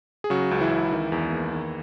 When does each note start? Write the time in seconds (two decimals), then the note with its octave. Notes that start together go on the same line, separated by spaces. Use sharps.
0.24 G#4
0.30 C#3 F#3 F#4
0.51 C#2
0.61 E3 E4
0.71 C#2
0.92 D#3
1.12 E2
1.33 A#3
1.53 D#3